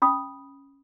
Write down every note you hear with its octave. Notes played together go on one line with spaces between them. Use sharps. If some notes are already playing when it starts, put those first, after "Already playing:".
C#4 B5 D#6